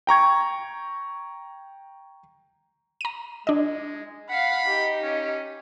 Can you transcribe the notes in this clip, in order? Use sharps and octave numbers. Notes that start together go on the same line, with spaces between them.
G5 A#5 C#6 G#6
A#5 D#7
G#3 D4 D#5
F5 F#5 B5
D#4 G4
C#4